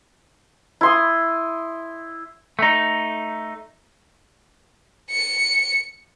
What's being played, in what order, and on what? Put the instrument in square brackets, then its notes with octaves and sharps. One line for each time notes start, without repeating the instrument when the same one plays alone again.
[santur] E4 C6 D#6
[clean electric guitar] A3 D#4
[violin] C#7